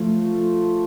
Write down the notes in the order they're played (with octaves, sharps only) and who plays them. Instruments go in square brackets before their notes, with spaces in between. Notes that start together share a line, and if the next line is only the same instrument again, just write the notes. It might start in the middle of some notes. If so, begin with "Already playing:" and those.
Already playing: [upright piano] F3 A3 F4